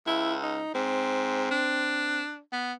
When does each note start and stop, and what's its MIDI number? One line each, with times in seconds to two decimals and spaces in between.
0.07 0.63 37
0.07 0.36 64
0.43 0.70 63
0.75 1.49 44
0.75 2.22 60
1.51 2.40 62
2.53 2.73 59